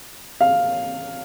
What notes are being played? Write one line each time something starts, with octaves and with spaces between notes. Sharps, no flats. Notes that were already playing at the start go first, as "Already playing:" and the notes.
F5